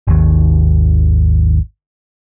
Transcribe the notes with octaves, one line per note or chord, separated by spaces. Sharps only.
G#1 D#2